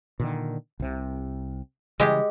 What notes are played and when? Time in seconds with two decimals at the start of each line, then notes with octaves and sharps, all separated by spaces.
0.20 A#2 D3 D#3
0.80 C2 C3
2.00 C#3 E3 G3 G#3 G4